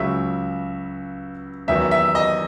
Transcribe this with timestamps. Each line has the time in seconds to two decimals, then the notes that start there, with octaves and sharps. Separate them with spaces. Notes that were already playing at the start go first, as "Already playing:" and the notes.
Already playing: C#2 C#3 F#3 E5
1.68 E2 D#3 F#3 E5
1.91 E5
2.15 D#5